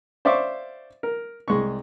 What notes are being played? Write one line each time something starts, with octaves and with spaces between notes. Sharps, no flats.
C5 D5 E5 F5 C#6 D6
A#4
C2 G#3 C#6